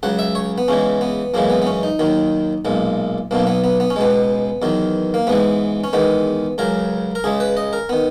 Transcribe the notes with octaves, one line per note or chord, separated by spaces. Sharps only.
C#2 C#3 F#3 F#5
E5
C#5
B3
E2 C#3 E3 G#3 C#4
B3
F#2 C#3 E3 G#3 A#3
B3
B3
C#4
D#4
D#2 D#3 F#3
B1 A#2 G#3
B1 B2 F#3 A#3
B3
B3
B3
C#4
C#2 B2 G#3 B3
E2 D#3 F#3
A#3
G#2 E3 G#3 B3
C#4
E2 D#3 G#3 B3
C#2 C#3 F#3 A#4
A#4
C#2 C#3 G#3 G#4
B4
D#5
A#4
D#3 B3